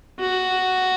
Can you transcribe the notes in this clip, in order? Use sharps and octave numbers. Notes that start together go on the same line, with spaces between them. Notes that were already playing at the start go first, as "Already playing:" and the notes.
F#4